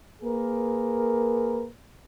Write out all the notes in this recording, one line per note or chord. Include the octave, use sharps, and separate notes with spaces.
A#3 G#4 A#4 B4